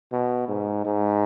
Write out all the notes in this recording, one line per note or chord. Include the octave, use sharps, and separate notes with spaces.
B2
G#2
G#2